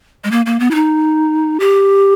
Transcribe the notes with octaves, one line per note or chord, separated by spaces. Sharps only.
G#3
A#3
A#3
B3
E4
D#4
G4